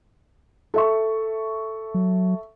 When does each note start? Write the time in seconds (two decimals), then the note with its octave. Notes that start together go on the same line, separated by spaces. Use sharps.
0.74 A4 E5 C#6
1.94 F#3